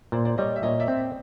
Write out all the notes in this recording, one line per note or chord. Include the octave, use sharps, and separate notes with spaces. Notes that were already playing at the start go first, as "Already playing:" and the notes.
A#2 C5 D5
C5 D5
G3 C#5 D#5
E5
A#2 C#5 D#5
D5 E5
C4